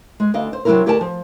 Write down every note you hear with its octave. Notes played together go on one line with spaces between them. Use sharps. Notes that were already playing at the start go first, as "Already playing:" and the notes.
G#3
D2 D4 D#5 F5
C5
C3 F#3 G#3 D4 E4 A#4
D2 G4 A#4 D5 G#5 A5
F3